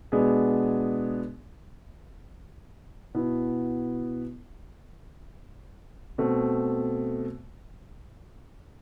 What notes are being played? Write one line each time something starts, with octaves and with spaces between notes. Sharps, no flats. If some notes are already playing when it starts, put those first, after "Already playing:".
B2 G#3 B3 D4 G#4
B2 B3 E4
B2 A3 C4